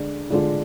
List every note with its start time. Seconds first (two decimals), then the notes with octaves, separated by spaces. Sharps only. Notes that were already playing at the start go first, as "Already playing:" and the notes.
Already playing: D3 G#3 D4
0.31 D3 G#3 D4 F4